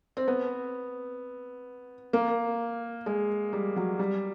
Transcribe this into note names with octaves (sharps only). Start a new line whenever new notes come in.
C4
B3
A#3
G#3
G3
F#3
G3